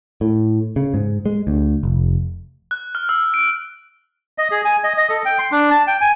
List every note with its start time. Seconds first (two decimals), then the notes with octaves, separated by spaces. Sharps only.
0.21 A2
0.76 C#3
0.94 G#2
1.26 G#3
1.47 D2
1.83 F1
2.71 F#6
2.95 F6
3.09 E6
3.34 D7
4.38 D#5
4.51 G#4
4.65 G#5
4.84 D#5
4.98 D#5
5.10 A4
5.25 G5
5.39 C6
5.52 D4
5.70 A5
5.87 G5
6.01 G#5